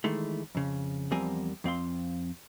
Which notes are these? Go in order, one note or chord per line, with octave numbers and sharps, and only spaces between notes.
D#3 E3 G#3 A3
F2 C#3
E2 F3 G3 C4 A#4 G#5
F2 C4 F5 C6